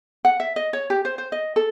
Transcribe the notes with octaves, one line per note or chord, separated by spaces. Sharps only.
F#5
E5
D#5
C#5
G4
C5
C5
D#5
A4